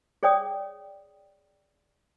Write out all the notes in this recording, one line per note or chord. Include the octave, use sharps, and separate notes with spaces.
G#4 C#5 D5 G5 D#6